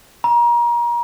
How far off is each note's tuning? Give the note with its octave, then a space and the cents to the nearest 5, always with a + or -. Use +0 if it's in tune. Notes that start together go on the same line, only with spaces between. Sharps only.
A#5 +30